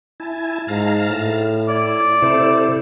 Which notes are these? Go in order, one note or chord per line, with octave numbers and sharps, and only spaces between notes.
E4 G#5 A5
G#2 F5 A5 A#5
A2
E4 D5
C3 E4 A4 C5